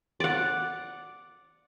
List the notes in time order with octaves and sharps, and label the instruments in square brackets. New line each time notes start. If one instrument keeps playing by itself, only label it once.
[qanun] D5 F#5